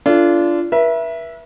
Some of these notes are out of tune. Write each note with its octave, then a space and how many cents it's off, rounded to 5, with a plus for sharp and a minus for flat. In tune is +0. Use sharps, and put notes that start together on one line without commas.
D4 -15 F4 -30 A4 +10
B4 -40 E5 +5